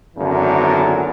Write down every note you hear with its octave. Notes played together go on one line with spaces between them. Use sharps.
G#1 F#2 D3 E3 B3 A#4